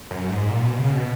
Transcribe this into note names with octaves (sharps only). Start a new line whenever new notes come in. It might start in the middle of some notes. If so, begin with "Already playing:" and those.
F#2
G#2
A#2
B2
C#3
B2